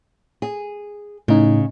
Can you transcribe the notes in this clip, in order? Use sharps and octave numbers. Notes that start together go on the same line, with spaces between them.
G#4
A2 C#3 D#4